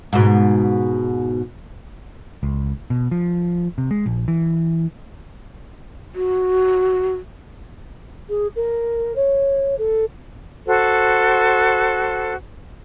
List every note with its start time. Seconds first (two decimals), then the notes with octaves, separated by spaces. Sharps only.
0.13 G#2 B2
2.43 C#2
2.90 B2
3.11 F3
3.78 C3
3.91 G#3
4.06 A#1
4.28 E3
6.15 F#4
8.29 G#4
8.56 A#4
9.16 C#5
9.78 A4
10.67 F#4 A4 C5